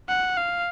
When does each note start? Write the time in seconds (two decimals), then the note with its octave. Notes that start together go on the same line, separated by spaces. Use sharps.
0.09 F#5
0.37 F5